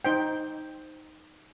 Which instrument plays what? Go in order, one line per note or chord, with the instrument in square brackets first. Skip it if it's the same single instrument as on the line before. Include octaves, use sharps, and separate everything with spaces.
[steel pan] D#4 C5 G5